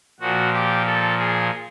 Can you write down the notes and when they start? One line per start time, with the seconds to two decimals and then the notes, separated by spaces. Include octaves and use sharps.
0.20 A#2 F3 F#4
0.53 G4
0.85 A4
1.18 G#4